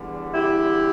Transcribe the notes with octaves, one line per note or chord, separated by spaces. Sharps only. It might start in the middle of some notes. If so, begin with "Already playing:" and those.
Already playing: E2 D3 G3
E4 G4